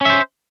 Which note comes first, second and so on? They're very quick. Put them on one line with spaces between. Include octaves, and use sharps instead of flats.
C#4 E5 C5